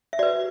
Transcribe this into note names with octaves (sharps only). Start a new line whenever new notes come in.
E5
F#4 B4 D5